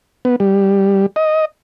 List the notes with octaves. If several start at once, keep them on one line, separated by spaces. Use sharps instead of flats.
B3
G3
D#5